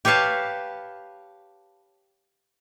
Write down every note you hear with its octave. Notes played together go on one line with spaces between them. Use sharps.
G4 B4 C#5 F5 A5